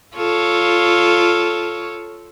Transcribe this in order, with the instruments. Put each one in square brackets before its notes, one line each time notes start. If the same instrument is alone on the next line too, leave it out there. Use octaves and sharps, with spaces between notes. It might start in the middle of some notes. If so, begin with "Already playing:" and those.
[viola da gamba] F4 A4 C#5